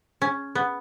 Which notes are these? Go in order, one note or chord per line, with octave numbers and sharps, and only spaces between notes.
C#4
B3